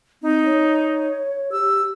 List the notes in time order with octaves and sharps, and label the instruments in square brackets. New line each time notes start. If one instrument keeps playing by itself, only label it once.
[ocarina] C4 [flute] D#4
[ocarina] C#5
[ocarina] G4 [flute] E6